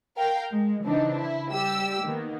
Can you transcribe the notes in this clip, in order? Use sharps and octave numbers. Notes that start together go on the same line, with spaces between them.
A#4 F5 G5
G#3
C#3 E3 C4 D4 D#4
E4
G3 G4 E6
D#3 A#3 B3